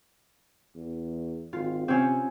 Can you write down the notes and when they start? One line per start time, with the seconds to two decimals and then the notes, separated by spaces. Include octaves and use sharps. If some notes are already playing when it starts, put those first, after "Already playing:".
0.76 E2
1.53 G#1 F4
1.88 C3 C4 C#4